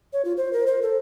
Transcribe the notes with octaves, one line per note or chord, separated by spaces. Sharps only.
C#5
F4
C5
A#4
C5
A4